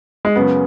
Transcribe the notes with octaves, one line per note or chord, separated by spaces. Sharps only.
G#3
F#2 C#3 F#3 B3 C#4